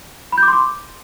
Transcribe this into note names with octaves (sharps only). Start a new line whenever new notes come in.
B5
G6
D6
C6
D6